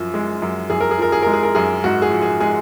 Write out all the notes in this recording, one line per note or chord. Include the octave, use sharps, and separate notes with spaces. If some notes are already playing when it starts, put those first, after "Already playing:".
Already playing: F#2 F3
G#3
F#2
F#2 G#4
A#4
G#4
F3 A#4
G#4
G#3 A#4
G#4
A#4
F#2 G#4
G#2 F#4
G#4
F3
G#4
G#3 G#4